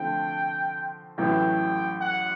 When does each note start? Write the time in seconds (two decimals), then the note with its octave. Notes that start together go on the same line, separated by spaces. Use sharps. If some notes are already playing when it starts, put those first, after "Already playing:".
Already playing: D3 F3 A3 C4 G5
1.18 A1 A2 F#3 B3 E4 G5
2.01 F#5